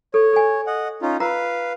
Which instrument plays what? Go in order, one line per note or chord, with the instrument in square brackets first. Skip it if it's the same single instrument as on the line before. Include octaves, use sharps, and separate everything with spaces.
[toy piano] A4 [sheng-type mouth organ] C#5
[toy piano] A4 G#5
[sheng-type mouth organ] D#5 F#5
C#4 D#4 F4
[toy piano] F4 A#5 E6 [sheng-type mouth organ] B4 F5